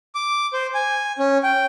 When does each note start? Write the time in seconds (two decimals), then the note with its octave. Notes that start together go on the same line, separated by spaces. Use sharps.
0.15 D6
0.53 C5
0.74 G#5
1.19 C#4
1.43 G5